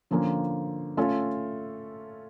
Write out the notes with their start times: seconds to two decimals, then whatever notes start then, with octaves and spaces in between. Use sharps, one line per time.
0.11 D3 F3 A#3 C#4
0.97 A3 C#4 F4 A4